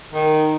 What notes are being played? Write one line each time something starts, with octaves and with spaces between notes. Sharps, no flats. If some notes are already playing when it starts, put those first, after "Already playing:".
D#3